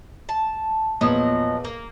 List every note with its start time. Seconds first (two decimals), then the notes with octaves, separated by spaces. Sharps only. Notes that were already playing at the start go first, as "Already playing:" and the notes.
0.29 A5
1.01 E2 A#2 F3 F#3 B3 D#5
1.65 A#3